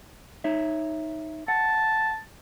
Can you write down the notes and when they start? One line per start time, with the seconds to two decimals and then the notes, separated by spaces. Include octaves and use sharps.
0.44 D#4 C#5 E5
1.48 F#5 A5